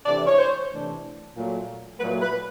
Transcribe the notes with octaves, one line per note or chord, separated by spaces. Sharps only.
C3 E3 A3 D4 D5
C#5
C5
C3 E3 A3 D4
A#2 F#3 A3
A#2 F#3 A3 B4
B4